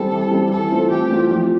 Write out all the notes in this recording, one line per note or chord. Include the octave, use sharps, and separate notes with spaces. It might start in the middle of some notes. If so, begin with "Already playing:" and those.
Already playing: E3 G3 C4 A4
E3
G3 C4
E3 A4
A3 C4 F4
E3 G4
A3 C4 F4
F3